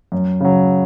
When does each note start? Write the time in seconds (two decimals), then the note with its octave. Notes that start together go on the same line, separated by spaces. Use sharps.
0.12 F#2
0.40 C#3 F#3